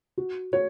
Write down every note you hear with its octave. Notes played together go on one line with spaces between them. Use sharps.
F#4
F#4 C#5